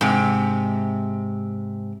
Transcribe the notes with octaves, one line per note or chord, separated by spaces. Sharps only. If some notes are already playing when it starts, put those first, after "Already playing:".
G#2 C3